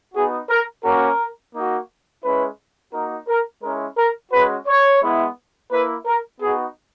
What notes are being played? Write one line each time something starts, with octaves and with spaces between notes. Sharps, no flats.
B3 D#4 F#4 G#4
A#4
A#3 C#4 F#4 A#4
A#3 D#4 F#4
G#3 C#4 E4 B4
A#3 D#4 F#4 A#4
A#4
G#3 C#4 E4 A#4
A#4
G#3 C#4 F#4 B4
C#5
G#3 B3 E4
A#3 E4 B4
A#4
B3 D#4 F#4 G#4